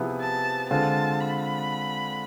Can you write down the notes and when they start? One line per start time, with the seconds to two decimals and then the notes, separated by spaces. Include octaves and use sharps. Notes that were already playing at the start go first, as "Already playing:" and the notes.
Already playing: C3 F3 B3 E4 G#4
0.20 A5
0.70 D3 G#3 C4 F4 A5
1.20 B5